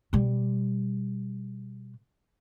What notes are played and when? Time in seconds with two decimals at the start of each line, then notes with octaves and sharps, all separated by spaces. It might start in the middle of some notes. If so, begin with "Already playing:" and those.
0.13 B2 G3